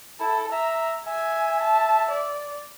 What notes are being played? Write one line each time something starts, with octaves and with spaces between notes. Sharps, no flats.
E4 A4
E5 A#5
E5 G#5
A5
D5